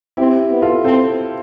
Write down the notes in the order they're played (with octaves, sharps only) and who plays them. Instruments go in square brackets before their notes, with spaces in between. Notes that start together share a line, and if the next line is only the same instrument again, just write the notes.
[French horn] C4 [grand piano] E4 G4
[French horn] B3
[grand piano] F4 A4
[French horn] C4 [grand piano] A4 C5